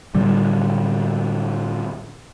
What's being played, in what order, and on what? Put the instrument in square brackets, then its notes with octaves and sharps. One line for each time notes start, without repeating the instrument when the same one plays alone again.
[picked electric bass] A2 D3 G3